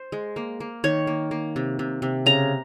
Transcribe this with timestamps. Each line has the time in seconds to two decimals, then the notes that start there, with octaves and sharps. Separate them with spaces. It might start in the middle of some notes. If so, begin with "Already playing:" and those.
Already playing: C5
0.12 G#3
0.36 A#3
0.60 A#3
0.84 D#3 C#5
1.07 A#3
1.31 A#3
1.56 C3
1.79 C3
2.02 C3
2.26 C#3 A#5